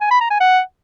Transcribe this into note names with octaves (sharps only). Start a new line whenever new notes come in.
G#5
B5
A#5
G#5
F#5